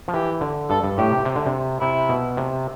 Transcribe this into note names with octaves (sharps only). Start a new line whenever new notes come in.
F3
E3 G4
D3
G2 A4
G2
A2 G4
C3
C3
D3
C3
C3 E4
B2
C3